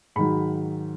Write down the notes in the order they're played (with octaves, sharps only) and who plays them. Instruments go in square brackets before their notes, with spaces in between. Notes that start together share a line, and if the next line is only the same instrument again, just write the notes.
[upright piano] G#2 D#3 F#3 B5